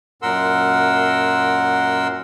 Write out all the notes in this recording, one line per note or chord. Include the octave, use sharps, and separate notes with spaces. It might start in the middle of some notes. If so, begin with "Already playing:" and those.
F#2 A#2 A#4 F#5 C6 E6